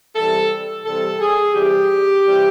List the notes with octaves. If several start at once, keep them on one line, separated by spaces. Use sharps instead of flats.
C3 E3 G3 A4
C3 E3 G3 A4
G#4
C3 E3 G3 G4
C3 E3 G3